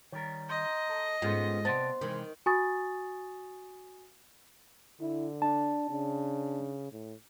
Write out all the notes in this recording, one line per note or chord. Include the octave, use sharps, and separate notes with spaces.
D#3 G3 A#4 C#5
D#5 A#5 C6 G6
A4
G#2 B3 C#4 F4 G#4 A4 C5
C3 B3 C5 D5 A5 C6
C3 D#3 E3 G#3
F#4 G#5 C#6 D#6 A6
D3 E4
D4 A5
C#3 D4
A2